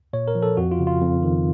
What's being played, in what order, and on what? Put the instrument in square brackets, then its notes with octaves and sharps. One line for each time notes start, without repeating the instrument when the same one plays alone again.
[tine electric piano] A#2 C#5
A#4
F3
A4
F2 F#4
F4
C#3
F4
F2
D#3